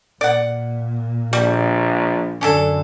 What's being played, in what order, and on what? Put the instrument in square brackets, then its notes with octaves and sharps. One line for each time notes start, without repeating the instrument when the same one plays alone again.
[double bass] A#2 [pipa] D5 F#5
[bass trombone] A#1 [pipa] G3
[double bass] F#2 D3 [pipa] C#4 D4 A4